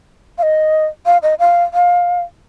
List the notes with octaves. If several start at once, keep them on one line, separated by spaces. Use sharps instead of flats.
F5
D#5
F5
D#5
F5
F5